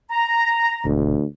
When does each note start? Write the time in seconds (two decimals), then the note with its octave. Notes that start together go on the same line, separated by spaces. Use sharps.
0.11 A#5
0.85 E1 D2